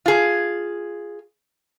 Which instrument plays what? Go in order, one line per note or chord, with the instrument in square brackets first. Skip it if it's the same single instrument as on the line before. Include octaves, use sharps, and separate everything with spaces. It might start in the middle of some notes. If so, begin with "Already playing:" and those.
[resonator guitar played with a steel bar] F4 G#4